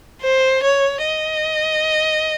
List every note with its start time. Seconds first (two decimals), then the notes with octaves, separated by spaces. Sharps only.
0.22 C5
0.64 C#5
1.06 D#5